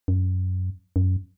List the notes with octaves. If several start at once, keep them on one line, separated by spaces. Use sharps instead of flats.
F#2
F#2